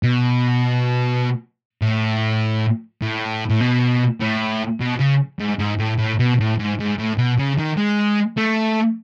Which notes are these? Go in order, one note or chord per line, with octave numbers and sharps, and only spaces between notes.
B2
A2
A2
A2
B2
A2
B2
C#3
G#2
G#2
A2
A2
B2
A2
G#2
G#2
A2
B2
C#3
D#3
G#3
A3